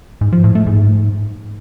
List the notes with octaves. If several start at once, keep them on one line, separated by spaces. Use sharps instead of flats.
G#2
F3
A2
A3
G#2